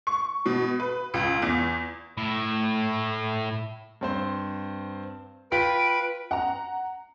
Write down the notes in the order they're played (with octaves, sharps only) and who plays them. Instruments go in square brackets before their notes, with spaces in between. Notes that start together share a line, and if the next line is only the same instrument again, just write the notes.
[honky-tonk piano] C#6
B2
B4
C#2
E2
[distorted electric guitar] A2 E4
[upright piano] G2 C4 C5
[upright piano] F4 G5 B6 [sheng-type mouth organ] B4 B5 [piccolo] D7
[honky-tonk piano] F#5 A#5